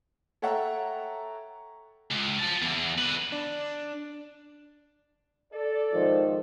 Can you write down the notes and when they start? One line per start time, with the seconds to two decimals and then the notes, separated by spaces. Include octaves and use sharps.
0.42 A4 C#5 E5 F#5 G5 A#5
2.11 C#2
2.39 F4 A5
2.62 E2
2.99 D3 B4
3.32 D4
5.52 A4 D5
5.93 G#2 D#3 F3